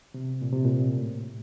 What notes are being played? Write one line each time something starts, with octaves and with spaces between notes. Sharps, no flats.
C3
A#2
C3
A#2
A2